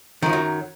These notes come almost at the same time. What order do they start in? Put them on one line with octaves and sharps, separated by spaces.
D#3 F3 F#2 F#3